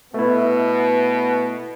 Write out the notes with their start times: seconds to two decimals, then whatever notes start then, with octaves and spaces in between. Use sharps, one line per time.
0.14 B2 A3 B3 E4